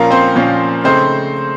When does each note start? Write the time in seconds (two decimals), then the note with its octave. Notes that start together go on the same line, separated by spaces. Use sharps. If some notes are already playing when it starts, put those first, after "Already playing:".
Already playing: A#2 F3 A#3 C#4 F4 A#4
0.10 C4 C5
0.35 A#2 F3 A#3 C#4 F4
0.84 C#3 A3 C4 D#4 C5